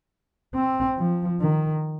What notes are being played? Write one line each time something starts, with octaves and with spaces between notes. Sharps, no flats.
C4
F3
D#3